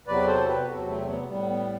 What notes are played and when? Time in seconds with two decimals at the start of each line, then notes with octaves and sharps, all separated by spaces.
0.07 E2 C3 F#3 B4 D5
0.27 A4 C5
0.47 G4 B4
0.67 E2 C3 F#3 F#4 A4
0.88 A3 C4
1.08 B3
1.28 A2 G3 B3
1.48 B3